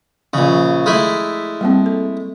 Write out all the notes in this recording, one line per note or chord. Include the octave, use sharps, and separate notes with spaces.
A#1 C#3 F3
G#3 A3 E4
G3 A#3 C4
A4